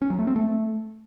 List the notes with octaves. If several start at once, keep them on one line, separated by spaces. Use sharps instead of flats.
C#4
F#3
A3
C4
A3